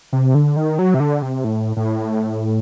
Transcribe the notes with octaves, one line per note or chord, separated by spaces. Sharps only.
C3
D3
D#3
F#3
C3
D3
C3
A2
A2